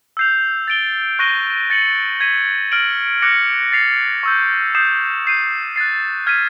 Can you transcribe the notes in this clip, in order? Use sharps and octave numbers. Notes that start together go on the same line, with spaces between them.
E6 G6 C7 F7
A6 D7 G7
C#6 F#6 A#6 D#7 G7
A6 C#7 F#7
G#6 B6 D#7
F6 A#6 D7 F#7
D6 F#6 A#6 C#7
A6 C7 F7
C#6 E6 G6
D#6 G6 C7 E7
G6 C7 D#7
F#6 A6 C7
F6 G#6 B6 D#7